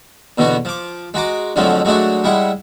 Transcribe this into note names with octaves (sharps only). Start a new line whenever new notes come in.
E2 B2 D3 B3 F#4
F3 D6
G#3 F#4 A#5 D6
F2 D3 F3 F#3 G#3 A3
F#3 G#3 A3 D4 F#4
G3 G#3 E4 F#5